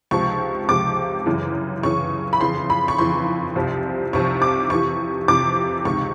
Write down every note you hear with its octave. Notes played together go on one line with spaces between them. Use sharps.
C#2 C3 F3 C#6
C#2 C3 F3 D6
F#2 C#3 E3
F#2 C#3 E3 C#6
B5
F2 C#3 E3 C6
B5
C#6
F2 C#3 E3 C6
C2 C3 F3
C2 C3 F3 C#6
D6
F2 C3 E3 C#6
F2 C3 E3 D6
C#2 C3 D#3 C#6